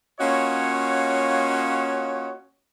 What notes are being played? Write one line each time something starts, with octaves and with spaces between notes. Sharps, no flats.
A#3 C#4 F4 F#4 C#5 D#5